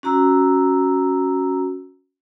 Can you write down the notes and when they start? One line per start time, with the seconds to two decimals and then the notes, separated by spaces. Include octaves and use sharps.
0.03 C#4 F#4 A#5 E6